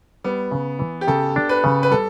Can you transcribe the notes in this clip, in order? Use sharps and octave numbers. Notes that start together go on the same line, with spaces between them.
G3 B3
C#3
E3
G4
C#3 A4
D4
B4
C#3
B4
G3 A4